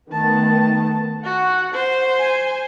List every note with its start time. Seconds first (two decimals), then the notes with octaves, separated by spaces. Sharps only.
0.12 D#3 A3 B3 A5
1.24 F#4 F#5
1.74 C5
2.19 G#5